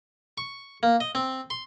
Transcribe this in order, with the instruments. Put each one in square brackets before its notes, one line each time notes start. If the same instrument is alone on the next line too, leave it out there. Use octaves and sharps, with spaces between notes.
[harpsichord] C#6
A#3
D#5
C4
C6